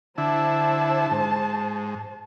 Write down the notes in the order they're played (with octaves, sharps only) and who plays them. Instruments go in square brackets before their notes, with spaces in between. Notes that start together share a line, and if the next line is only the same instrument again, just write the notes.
[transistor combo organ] D3 E4 [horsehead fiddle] C5 A5
[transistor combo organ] G#2